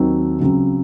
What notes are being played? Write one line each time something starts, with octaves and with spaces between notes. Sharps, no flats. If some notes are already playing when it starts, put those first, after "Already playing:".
Already playing: D#2 D#3 F#3 C4
C#2 C#3 F#3 C4